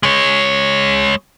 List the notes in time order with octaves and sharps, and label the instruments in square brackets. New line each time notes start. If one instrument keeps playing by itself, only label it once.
[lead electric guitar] G#3 C#5